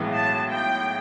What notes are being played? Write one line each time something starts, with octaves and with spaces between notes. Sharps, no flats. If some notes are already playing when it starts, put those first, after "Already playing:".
Already playing: B1 A2 E3 G#3 B3
A5
G5